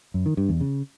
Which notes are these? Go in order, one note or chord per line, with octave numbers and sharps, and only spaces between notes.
F#2
D#3
G2
E2
C#3